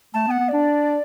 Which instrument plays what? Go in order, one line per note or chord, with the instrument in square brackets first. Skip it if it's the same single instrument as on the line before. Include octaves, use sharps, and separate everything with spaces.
[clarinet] A3 [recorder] A5
[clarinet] B3
[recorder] F#5
[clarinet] B3
[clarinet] D4 [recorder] D5